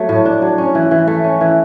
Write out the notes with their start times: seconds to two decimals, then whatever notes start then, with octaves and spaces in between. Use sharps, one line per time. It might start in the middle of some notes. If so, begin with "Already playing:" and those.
Already playing: F#3 A3
0.09 A2
0.25 D4
0.42 F#3
0.58 C#4
0.75 E3
0.91 E3
1.07 A3
1.24 C#4
1.41 E3